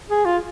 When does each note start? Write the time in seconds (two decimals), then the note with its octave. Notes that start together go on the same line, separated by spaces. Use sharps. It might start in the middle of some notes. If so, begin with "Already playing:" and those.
0.10 G#4
0.25 F4